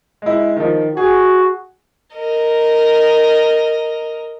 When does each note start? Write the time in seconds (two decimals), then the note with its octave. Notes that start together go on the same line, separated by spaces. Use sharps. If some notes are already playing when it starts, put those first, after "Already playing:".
0.22 G#3 E4
0.56 D#3 F3
0.97 F#4 G#4
2.16 A#4 D#5